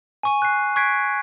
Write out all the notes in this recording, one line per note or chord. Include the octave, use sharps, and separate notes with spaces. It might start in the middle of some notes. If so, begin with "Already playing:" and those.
G#5 C#6 D#7
F#6 C7
C#6 F#6 G#6 B6 C7 D7